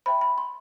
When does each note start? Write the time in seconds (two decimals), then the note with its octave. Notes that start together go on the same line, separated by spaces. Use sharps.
0.06 C5 E5 G5 B5
0.21 B5
0.38 C6